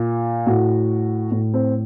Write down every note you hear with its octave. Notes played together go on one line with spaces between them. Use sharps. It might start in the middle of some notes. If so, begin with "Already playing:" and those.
Already playing: A#2
A2 F#4
A2
C4